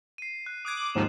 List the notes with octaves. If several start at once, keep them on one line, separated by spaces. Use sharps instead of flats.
C7 D#7
F#6
D6 D#6 F#6 G#6
F#7
D#2 G#2 F3 E7